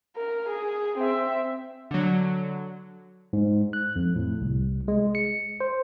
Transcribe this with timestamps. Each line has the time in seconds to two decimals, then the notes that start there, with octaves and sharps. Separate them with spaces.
0.16 A#4
0.49 G#4
0.98 C4 E5
1.91 D3 F#3
3.33 G#2
3.73 F#6
3.96 F2
4.16 A2
4.41 C2
4.88 G#3
5.15 C#7
5.60 C5